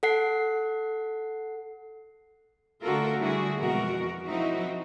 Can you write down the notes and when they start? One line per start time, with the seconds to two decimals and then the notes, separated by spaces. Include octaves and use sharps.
0.03 A4 F#5 C7
2.81 D3 A3 F4 F#4 A4 A#4
3.17 D3 G3 E4 F#4 G#4
3.58 F2 B2 E3 G#3 F#4 A#4
4.26 F3 C4 D#4 E4 F#4